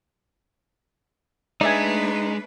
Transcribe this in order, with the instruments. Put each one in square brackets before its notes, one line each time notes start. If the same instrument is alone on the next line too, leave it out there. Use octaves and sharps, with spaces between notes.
[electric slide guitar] G#3 [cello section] A3 D4 B4 [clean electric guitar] D#4 [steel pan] D5 E5 G#5